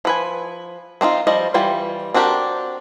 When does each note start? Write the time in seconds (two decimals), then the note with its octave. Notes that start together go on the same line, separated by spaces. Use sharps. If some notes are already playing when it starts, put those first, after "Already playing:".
0.05 F3 B4 G#5
1.01 C4 D4 D#4 F4
1.27 F3 G3 C5 D#5
1.54 E3 G3 F4 G5
2.14 C4 D4 F#4 G4 A#4